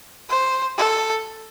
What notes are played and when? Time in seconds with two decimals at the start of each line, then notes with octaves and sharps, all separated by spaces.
0.29 C5
0.78 A4